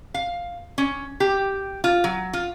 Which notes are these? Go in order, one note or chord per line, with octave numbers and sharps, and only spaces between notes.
F5
C#4
G4
F4
F#3
F4